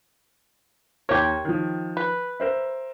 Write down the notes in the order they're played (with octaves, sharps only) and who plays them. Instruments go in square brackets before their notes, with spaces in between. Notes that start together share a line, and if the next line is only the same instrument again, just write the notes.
[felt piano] D#2 A#4 [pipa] G4 C#5
[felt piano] D#3 F3
[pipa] B4
[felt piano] A#4 C5 E5